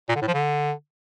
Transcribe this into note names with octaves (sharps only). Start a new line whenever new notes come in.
A#2
D3
A2
F3
D3